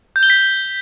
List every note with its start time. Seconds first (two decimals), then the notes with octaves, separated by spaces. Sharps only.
0.16 G6
0.23 G7
0.30 B6